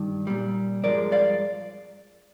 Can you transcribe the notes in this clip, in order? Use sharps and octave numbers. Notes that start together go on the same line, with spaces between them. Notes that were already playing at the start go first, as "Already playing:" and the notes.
Already playing: G2 D#3
A#2 G3
G2 F3 G#3 A#4 D5
D5 F5